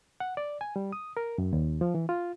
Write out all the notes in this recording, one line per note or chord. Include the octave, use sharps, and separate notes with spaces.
F#5
D5
G#5
G3
D#6
A#4
F#2
D#2
F3
E3
F4